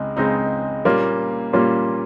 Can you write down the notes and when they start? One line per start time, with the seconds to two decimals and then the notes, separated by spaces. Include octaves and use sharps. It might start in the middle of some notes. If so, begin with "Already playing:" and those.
Already playing: C#2 C#3 G#3 C4 D#4
0.17 C#2 C#3 G#3 C4 D#4
0.85 A#2 G3 A#3 C#4 F4
1.53 A#2 G3 A#3 C#4 F4